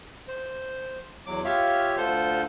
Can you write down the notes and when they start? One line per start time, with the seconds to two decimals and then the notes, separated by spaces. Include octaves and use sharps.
0.28 C5
1.26 E2 F#3 D6
1.45 F4 G4 C#5 E5 F5
1.97 D2 D3 F4 A4 C5 G6